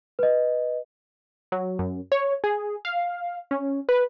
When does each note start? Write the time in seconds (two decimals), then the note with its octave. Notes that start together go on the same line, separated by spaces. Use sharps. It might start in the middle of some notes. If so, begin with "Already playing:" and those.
0.19 B4 D#5
1.52 F#3
1.79 F#2
2.12 C#5
2.44 G#4
2.85 F5
3.51 C#4
3.89 B4